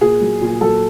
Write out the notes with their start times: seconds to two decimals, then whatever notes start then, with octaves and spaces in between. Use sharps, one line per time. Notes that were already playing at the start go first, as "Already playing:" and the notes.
0.01 A#2 G#4
0.21 F#3
0.41 A#2
0.61 F#3 A4